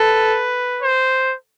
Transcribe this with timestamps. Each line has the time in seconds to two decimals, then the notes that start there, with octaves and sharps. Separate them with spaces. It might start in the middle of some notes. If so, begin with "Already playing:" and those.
Already playing: A4 B4
0.83 C5